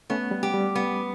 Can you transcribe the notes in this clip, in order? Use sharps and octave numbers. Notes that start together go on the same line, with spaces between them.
A3 B3 C#4
G3
G4
G3
B3